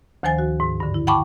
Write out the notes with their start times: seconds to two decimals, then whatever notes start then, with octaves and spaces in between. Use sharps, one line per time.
0.23 D2 D#3 F3 C5 G#5 A6
0.39 F#4
0.60 G#2
0.80 G2 D3
0.94 E4
1.07 F#5 G5 A5 B5 C#6 D6